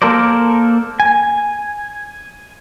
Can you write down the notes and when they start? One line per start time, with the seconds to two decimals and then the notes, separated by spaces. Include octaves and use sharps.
0.02 A#3 A4 A#4 C5 D5
1.00 G#5